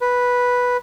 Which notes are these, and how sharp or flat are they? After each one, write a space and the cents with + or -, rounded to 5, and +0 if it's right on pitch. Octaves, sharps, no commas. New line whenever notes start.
B4 -5